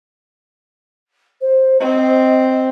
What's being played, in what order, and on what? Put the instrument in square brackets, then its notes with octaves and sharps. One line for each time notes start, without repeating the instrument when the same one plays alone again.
[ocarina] C5
[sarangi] C4 [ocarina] D#5